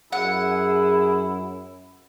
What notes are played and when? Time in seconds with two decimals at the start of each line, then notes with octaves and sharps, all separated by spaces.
0.12 F#2 E4 G#4 F#5